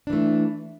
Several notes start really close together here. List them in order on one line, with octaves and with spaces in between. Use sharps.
D4 E3 A3